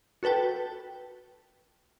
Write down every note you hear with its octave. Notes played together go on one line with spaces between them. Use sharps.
F#4 A4 B4 G5 A5